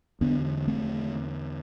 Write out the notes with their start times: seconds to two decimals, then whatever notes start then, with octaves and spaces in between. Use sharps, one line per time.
0.21 E2 D3 B3 D4
0.67 A3 C4